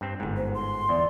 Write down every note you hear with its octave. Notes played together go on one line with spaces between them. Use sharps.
G2 C4
G1 G#2
C5
C6
E2 D5